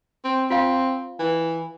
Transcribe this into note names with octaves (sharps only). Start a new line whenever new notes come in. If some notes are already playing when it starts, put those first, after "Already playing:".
C4
C4 F4 F5
E3